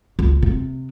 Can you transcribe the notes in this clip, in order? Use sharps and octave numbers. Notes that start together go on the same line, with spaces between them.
C#2
C3